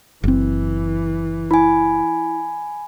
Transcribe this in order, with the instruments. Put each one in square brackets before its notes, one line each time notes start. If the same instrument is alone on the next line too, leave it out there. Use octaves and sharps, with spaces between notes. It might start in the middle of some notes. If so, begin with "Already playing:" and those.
[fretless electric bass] F#1 C4 [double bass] E3
[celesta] E4 [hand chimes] G#5 B5